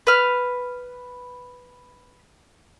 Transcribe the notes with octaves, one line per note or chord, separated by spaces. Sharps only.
B4 F6